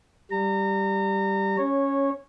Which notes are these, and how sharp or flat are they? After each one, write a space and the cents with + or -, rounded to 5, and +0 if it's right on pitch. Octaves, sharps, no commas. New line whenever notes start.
G3 +0 A#5 -30
C#4 +0 C#5 -15